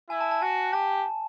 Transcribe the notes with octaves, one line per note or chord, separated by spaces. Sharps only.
E4 G#5
A5
A5
F#4 G#5
G4 A5